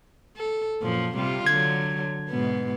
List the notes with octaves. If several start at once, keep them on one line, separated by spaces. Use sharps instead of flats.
A4
F#2 A#2 F3
C3 G3 F4
D3 F#3 G#6
G#2 B2 B3